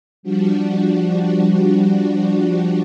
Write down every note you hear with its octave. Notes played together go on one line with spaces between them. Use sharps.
F3 G3 D4 F#4